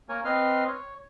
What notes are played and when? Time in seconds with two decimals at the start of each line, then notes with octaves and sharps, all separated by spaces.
0.09 A#3 A#4 C#5 G#5
0.25 C4 B4 D#5 C6 F6
0.67 C#5